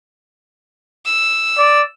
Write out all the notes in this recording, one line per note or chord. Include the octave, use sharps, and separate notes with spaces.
E6
D5